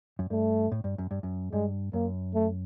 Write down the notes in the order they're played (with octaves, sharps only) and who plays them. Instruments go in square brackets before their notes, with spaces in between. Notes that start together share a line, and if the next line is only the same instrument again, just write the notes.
[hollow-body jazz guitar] F#2
[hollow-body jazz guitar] G2 [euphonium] A3
[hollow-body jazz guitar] A2
G2
F#2
G2
F#2
[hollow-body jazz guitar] G2 [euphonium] G#3
[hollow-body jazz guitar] F#2 [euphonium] A#3
[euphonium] A3